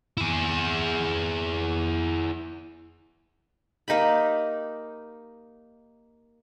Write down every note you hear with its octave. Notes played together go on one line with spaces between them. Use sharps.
E4 G#4
A#3 D#4 G4 B5